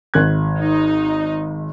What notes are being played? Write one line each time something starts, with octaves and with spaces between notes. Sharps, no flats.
G#1 F#6 G#6
D#4